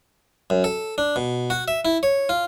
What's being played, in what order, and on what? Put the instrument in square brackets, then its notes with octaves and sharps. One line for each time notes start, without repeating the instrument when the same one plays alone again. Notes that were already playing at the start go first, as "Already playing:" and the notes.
[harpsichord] F#2
A4
D4
B2
F#4
E5
E4
C#5
F4